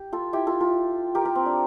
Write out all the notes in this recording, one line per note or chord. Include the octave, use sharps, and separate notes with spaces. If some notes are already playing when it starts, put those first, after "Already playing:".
Already playing: G4
F4 A4
E4 G4
F4 A4
F4 A4
G4 A#4
G4 A#4
C4
D4